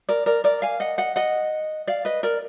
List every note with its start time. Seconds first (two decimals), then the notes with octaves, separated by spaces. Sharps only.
0.09 A#4 D5
0.26 A#4 D5
0.44 A#4 D5
0.62 F5 G#5
0.80 D#5 F#5
0.98 D#5 F#5
1.16 D#5 F#5
1.87 D5 F5
2.05 B4 D#5
2.23 A#4 D5